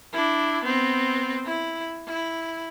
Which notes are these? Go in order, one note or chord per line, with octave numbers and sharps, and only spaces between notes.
D4 E4
B3 C4
E4
E4